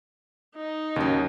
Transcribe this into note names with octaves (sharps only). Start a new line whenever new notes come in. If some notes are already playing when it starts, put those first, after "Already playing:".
D#4
D#2 C#3 F#3